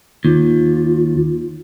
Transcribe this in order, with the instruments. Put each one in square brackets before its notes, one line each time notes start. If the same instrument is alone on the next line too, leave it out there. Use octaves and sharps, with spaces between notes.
[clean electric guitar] D#2 [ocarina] F4